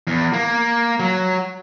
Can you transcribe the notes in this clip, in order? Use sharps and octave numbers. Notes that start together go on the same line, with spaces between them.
E2
A#3
F#3